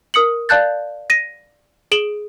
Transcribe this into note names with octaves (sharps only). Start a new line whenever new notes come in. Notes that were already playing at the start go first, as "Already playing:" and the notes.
A#4 D#6 C#7 F#7
D5 F5 A5 F#6 G6 A6
A#6 D#7
G#4 D7 E7 F#7 G7